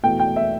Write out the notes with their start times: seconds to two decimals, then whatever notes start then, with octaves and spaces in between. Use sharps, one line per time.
0.03 E2 B2 A3 G5
0.19 G5
0.36 E5